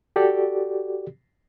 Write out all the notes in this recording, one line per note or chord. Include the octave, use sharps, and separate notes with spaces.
F#4 G4 A4 D5